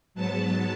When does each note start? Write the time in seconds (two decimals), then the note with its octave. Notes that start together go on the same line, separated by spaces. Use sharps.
0.14 G#2 F#3 B3 A5